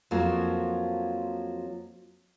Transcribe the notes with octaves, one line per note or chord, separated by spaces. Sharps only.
F2 F3 F#3 A#3